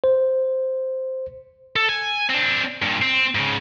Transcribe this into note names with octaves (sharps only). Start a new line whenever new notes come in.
C5
A4
G#5
C4 D4
G2 A#2
C4
G#2 C#3